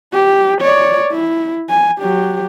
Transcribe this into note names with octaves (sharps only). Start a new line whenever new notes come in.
G4
C#5 D5
E4
G#5
F#3 G4